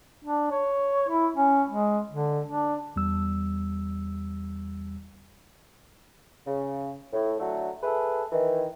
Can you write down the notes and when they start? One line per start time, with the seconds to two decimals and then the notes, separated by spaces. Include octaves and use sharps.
0.24 D4
0.51 C#5
1.08 E4
1.36 C#4
1.69 G#3
2.09 D3
2.47 D4
2.96 E2 G3 E6
6.47 C#3
7.13 A2
7.39 D3 F#3 A3
7.83 G#4 A4 B4 E5
8.32 D#3 E3